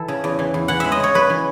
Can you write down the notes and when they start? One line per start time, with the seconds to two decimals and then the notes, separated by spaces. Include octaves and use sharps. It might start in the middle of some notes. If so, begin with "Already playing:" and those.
Already playing: E3 A4
0.08 C#3
0.24 E2
0.39 E3
0.54 E2
0.68 E3 F#5
0.80 G#3 E5
0.92 D#5
1.00 C#3 C#5
1.15 F#2 B4
1.30 E3